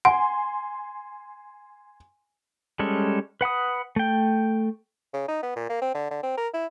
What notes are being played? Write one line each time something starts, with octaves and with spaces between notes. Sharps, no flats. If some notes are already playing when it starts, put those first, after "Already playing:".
F#5 G#5 C6
G3 G#3 C#4 A4
B4 F#5 B5 D#6
A3 G5
C#3
D#4
B3
A#2
A#3
C4
D3
D3
C4
A#4
E4